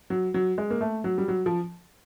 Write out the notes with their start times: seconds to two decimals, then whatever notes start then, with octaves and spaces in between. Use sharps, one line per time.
0.10 F#3
0.34 F#3
0.58 G#3
0.70 A#3
0.81 A3
1.04 F#3
1.18 G3
1.28 F#3
1.46 F3